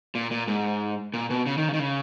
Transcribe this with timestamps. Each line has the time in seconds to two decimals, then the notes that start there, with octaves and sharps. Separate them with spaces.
0.15 A#2
0.31 A#2
0.48 G#2
1.14 A#2
1.30 B2
1.46 C#3
1.58 D#3
1.69 C#3
1.73 D#3
1.79 C#3